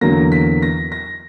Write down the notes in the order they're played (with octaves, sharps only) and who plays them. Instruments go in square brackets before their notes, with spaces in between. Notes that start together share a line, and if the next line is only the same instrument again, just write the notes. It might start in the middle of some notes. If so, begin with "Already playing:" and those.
[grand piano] E2 D3 F#3 A#3 A#6
B6
A#6
A#6